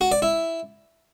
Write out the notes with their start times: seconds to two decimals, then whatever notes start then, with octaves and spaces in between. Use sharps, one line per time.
0.01 F#4
0.12 D5
0.22 E4